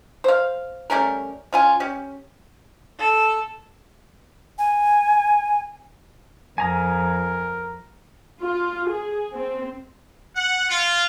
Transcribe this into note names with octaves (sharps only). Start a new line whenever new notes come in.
C5 F5
G3 A3 C#4 A#4
C#4 F4 G#5
C#4 G4
A4
G#5
F2 A#4 G#5 A#5 D#6
F4
G#4
C4
F#5
F4